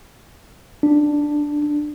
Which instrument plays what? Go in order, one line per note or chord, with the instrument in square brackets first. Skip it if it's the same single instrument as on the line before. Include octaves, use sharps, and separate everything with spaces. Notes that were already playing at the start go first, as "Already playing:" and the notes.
[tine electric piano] D4